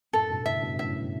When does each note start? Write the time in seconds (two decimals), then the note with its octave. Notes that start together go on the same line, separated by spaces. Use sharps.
0.13 F#2 A2 A4
0.30 G2 B2
0.46 A2 C#3 E5
0.62 G2 B2
0.79 F#2 A2 E5